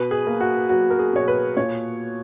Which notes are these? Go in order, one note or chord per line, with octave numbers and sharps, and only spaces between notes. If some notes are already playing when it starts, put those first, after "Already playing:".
Already playing: B2 B4
G#4
A#3
F#4
F#3 F#4
A#4
G#4
B2 C#5
B4
A#2 C#5